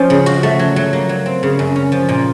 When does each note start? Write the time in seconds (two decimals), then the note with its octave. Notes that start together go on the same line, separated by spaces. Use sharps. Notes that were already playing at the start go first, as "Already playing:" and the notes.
Already playing: F3 C#4
0.10 C#3
0.26 F#4
0.43 A3
0.59 F#3
0.76 F#3
0.93 A#3
1.09 F#3
1.26 C4
1.43 C#3
1.59 F#2
1.76 C#4
1.92 F3
2.09 A#2